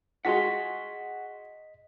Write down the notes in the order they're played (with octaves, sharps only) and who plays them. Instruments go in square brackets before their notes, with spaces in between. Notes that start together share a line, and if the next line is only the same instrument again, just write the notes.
[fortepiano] F4 F#4 G#4 [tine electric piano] D#5 B6 [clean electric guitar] F#5 A5 C6